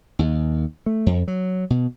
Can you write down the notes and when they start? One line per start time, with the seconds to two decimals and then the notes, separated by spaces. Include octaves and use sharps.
0.19 D#2
0.86 A3
1.06 F2
1.28 F#3
1.70 B2